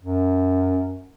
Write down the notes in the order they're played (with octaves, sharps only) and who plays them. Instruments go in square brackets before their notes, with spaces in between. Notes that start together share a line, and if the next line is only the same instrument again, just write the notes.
[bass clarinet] F#2